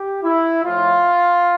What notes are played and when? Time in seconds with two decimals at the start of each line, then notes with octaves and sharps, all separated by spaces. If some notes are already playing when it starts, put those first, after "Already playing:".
Already playing: G4
0.24 E4
0.64 A2 F3 F4